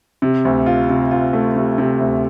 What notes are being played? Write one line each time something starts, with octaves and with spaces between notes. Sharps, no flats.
C3
D2
F4
C3
F4
A3
C3
C3
D2